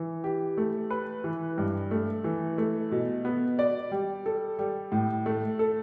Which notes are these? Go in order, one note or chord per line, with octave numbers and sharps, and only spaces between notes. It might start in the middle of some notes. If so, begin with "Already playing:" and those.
Already playing: E3
G4
A3
B4
E3
G2
A3
E3
A3
B2
B3
D5
G3
A4
G3
A2
A3
A4